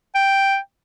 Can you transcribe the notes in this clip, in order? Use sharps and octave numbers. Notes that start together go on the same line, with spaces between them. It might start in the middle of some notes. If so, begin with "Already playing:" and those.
G5